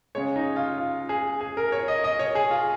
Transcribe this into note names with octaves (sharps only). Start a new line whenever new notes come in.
C#3 G#3 C#5
D#4
F4
F4
G#4
G#4
A#4
C#5
D#5
D#5
C#5
G#4
F4